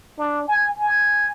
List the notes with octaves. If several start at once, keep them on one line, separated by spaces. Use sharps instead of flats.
D4
G#5
G#5